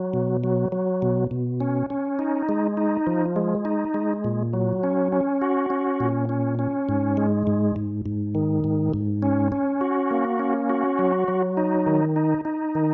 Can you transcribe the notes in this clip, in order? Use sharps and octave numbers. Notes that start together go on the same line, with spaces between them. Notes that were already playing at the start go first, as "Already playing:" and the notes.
Already playing: F#3
B2
F#3
F#3
B2
B2
C#4
C#4
D#4
G#3
D#4
F3
G#3
D#4
G#3
A#2
F#3
C#4
C#4
F#4
C#4
A#2
C#4
C#4
G#2
G#3
G#2
G#2
G#2
D#3
G#2
G#2
C#4
C#4
F#4
A#3
C#4
F#4
F#3
F#3
D#4
D#3
D#4
D#4
D#3